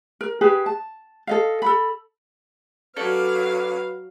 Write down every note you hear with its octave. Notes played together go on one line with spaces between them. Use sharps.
A#4
G4 G#4 B4 G#5
A5
A4 D#5 F5
A4 B5
F#3 C#4 A4 B4 D5 F5